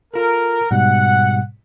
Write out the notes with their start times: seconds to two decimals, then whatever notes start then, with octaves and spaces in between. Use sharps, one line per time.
0.14 F4 A4 A#4
0.71 G#2 B2 G3 F#5